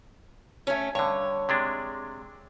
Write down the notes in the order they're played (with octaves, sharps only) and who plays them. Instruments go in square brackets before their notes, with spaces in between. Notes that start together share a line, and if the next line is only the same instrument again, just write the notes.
[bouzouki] A3 C#4
[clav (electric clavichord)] G2 D3 [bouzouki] C#5
[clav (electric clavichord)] C3 G#3 D4